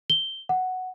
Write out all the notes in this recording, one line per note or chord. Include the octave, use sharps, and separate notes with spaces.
G7
F#5